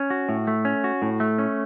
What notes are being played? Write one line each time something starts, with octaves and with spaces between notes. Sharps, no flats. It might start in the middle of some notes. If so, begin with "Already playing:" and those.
Already playing: C#4
F#4
A2
A3
C#4
F#4
A2
A3
C#4